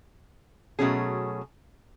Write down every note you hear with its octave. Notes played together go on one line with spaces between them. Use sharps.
B2 F#3 A3 C#4 G#4